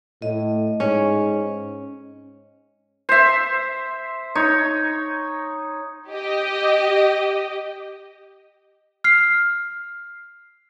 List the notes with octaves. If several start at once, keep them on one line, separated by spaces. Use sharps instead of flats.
A2 D#5
G#2 C#4
C5 E5
D#4 C#5
G4 D#5
F6 C7